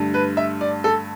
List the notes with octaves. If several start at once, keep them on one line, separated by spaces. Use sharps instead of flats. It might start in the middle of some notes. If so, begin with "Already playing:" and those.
Already playing: G2 D3 A3
B4
E5
D5
A4